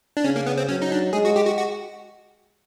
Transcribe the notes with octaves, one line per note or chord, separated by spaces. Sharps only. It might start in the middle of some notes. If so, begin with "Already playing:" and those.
D4
C#3 C#4
A#3
B3
C4
F#3 C#4
D#4
D4
G#3 G#4
F#4
G4
F#4
F#4